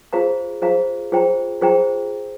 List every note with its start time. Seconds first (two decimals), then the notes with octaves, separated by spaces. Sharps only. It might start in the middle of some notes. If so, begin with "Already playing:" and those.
0.13 F4 G#4 C5 F5 A#5
0.62 F4 G#4 C5 F5 A#5
1.12 F4 G#4 C5 G5 A#5
1.61 F4 G#4 C5 G5 A#5